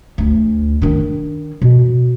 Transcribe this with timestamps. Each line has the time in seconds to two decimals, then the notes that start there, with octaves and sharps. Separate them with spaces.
0.18 D2
0.82 D#3 D4
1.62 B2